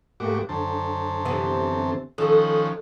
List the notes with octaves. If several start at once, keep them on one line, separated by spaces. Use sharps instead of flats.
G#2 A3 A#3 F#4 G4 D6
F#2 D3 C5 A5
C3 E3 B3
D#3 F3 C#4 A4 D#6 F#6